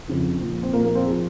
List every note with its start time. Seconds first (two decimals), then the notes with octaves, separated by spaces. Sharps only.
0.08 F2 C#3 F3
0.41 A#2 F3
0.63 C4
0.73 A#2 F3 A#3
0.85 A#3
0.95 C4
1.06 F3 G#4